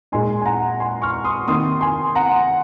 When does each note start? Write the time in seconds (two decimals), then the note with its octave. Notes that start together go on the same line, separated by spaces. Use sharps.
0.12 A#2 G#3 D#4 G#5 C6
0.41 G#5
0.46 F#5 A#5
0.80 G#5 C6
1.02 C#6 F6
1.24 C6 D#6
1.47 C3 D#3 A#3 C6 D#6
1.81 G#5 C6
2.15 F#5 A#5